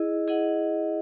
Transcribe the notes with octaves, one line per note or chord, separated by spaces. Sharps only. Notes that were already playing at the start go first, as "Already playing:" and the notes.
Already playing: E4 G#4 D#5
E4 G#4 D#5 F#5